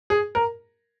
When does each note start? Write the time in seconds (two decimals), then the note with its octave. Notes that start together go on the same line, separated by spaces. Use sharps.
0.10 G#4
0.35 A#4